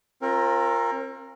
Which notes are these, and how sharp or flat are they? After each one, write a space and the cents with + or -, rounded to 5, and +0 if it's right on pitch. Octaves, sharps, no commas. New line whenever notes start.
C4 +40 F4 +0 A#4 +0